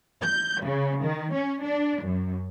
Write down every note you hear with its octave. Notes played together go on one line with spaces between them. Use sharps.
G6
C#3
D#3
C#4
D4
F#2